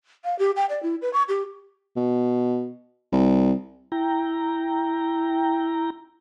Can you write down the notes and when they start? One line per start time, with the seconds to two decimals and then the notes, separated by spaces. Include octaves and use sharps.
0.24 F5
0.39 G4
0.56 G5
0.70 D5
0.83 E4
1.02 B4
1.14 C#6
1.29 G4
1.96 B2
3.12 C2
3.92 E4 G5 A#5